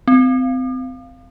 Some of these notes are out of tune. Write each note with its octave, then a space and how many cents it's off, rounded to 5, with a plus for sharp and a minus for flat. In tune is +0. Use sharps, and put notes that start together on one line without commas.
C4 -30